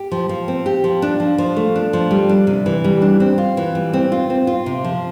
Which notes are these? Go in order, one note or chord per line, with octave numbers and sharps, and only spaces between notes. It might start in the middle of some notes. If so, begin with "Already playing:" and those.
Already playing: G4
F3
F3
C4
G4
F3
D4
F3
F3
A3
D4
F3
G3
D4
C3
E3
G3
D4
C4
F4
E3
G3
C4
F4
C4
F4
C3
F3